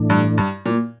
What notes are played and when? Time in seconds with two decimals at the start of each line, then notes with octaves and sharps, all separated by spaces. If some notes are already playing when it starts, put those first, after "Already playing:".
Already playing: A2 E3 A3 D4
0.10 G2
0.38 G2
0.66 A#2